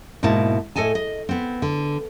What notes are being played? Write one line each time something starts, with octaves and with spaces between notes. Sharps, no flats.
G#2 B2 A#3 E4 A5
A2 A4 D#5 G#5 A5
D#5
B3 C4
D3